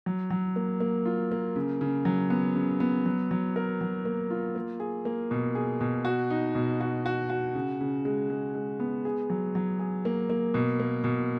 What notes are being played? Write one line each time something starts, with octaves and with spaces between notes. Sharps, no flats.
F#3
F#3
A#3
A#3
F4
A#3
C#3
C#3
F#3
B3
C#3
B3
F#3
F#3
A#4
F#3
A#3
F4
A#3
G#4
A#3
B2
G#4
B2
F#4
D#4
B2
F#4
F#4
F#4
C#3
C#3
G#3
G#3
G#3
B3
G#4
F#3
F#3
G#4
A#3
A#3
B2
A#3
B2